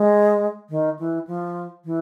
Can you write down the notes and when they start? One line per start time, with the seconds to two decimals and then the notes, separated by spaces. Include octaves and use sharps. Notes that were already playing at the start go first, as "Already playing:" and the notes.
Already playing: G#3
0.70 D#3
0.99 E3
1.27 F3
1.85 E3